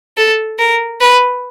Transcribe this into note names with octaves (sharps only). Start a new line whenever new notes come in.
A4
A#4
B4